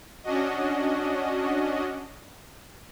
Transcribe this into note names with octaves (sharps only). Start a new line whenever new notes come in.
C#4 D4 F#4 D#5